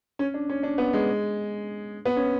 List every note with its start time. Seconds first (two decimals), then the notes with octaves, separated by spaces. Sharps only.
0.19 C#4
0.34 D4
0.49 C#4
0.63 D4
0.78 B3
0.93 G#3
2.05 B3
2.16 C#4